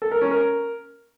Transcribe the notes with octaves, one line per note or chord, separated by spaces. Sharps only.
A4
A#4
C#4
A#4